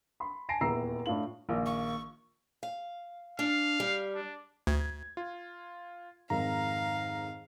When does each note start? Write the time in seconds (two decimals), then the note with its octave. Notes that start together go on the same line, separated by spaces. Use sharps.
0.20 B5 C6
0.49 G#5 A5 A#6 C7 D7
0.61 D#1 E2 E4 A#5 E6 C7
1.06 A2 D4 F4 F#7
1.49 A#1 D#3 A#3
1.66 C#6
2.63 F5
3.39 D4 F5
3.80 G3
4.15 D4
4.67 D2 G#6
5.17 F4
6.30 F2 G#2 D#3 F5 A#5